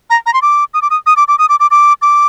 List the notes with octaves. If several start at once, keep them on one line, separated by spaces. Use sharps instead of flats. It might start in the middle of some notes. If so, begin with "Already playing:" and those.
A#5
A#5
C6
D6
D#6
D6
D#6
D#6
D6
D6
D#6
D6
D6
D6
D6